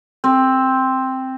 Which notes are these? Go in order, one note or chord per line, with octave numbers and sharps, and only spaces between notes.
C4